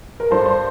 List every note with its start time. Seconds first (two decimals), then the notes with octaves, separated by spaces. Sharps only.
0.20 A#4
0.31 G2 A4 C5
0.46 C5